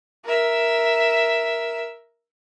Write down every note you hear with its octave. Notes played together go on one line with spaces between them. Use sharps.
A#4 E5